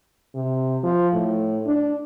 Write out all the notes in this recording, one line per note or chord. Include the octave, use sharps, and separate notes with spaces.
C3
F3
A2
D4